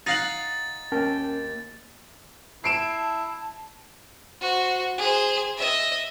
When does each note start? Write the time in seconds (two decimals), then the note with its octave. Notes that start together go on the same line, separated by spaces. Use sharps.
0.07 D#4 F5 F#5 A6
0.92 D#2 C#4 A#4 G5 A5
2.64 E4 A5 C7 D7 E7
4.41 F#4 C5
4.98 G#4 C5
5.57 D#5 E5